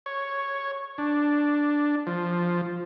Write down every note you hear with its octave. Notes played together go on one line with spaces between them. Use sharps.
C#5
D4
F3